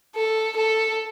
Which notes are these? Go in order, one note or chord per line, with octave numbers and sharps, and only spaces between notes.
A4
A4